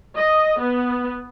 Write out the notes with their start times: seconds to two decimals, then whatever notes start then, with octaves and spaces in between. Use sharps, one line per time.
0.17 D#5
0.61 B3